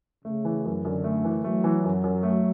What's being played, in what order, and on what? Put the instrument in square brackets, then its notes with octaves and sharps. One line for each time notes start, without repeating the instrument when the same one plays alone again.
[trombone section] C#3 [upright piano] A3
[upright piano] E3
F#2
[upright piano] F#2 [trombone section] D3
[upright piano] A3
E3
[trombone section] F#3 [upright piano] A3
[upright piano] E3
F#2
F#2
A3